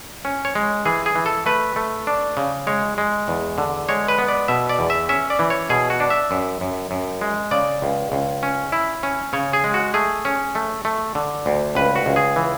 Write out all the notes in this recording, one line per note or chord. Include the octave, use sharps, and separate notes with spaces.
C#4
C#5
G#3
E3 G#4
G#4
E3
A4
A3 B4
A3
D4
C#3
G#3 C#5
G#3
E2
D3
G#3 C#5
B4
B3
D5
B2 E5
D5
E2
E5
C#4 E5
D5
E3
C#5
B2 G#4
F#4
D4
E5
F#2
F#2
F#2
G#3
C#3 D5
C#2
C#2
C#4
E4
C#4
C#3 C#5
G#4
G#3
F#4
A3 G#4
C#4
A3
A3
D3
D2
C#2 B4
F#4
C#2
G#4
E3